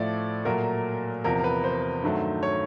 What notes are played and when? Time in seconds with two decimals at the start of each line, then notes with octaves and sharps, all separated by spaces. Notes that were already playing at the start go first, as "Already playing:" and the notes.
Already playing: A2 F3 A3 D5
0.45 A#2 F#3 A3 A#4
1.24 E2 C3 F3 A#4
1.44 B4
1.64 C5
2.02 G2 D#3 F#3 A3
2.43 C#5